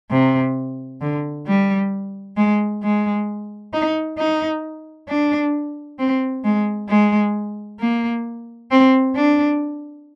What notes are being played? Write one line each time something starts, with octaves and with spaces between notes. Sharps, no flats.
C3
D3
G3
G#3
G#3
D#4
D#4
D4
C4
G#3
G#3
A#3
C4
D4